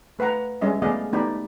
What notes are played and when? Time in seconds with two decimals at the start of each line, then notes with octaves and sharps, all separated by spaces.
0.19 A3 B4 F5 F#5 A#5
0.61 G3 G#3 C#4 D#5 E5
0.82 A3 B3 G#4 D5 D#5 F5
1.12 A3 B3 D#4 G4 D5 B5